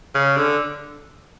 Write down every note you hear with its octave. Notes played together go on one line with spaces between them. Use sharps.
C#3
D3